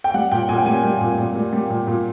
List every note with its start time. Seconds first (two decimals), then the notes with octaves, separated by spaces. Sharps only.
0.04 G5
0.14 G3 F#5
0.32 A#2 G5
0.49 A#2 G#5
0.58 G5
0.66 G3 G#5
0.84 G3
1.01 A#2
1.18 A#2
1.35 G3
1.52 G3
1.70 A#2
1.87 A#2